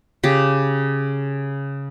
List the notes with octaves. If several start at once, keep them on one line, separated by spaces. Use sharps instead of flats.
C#3 G4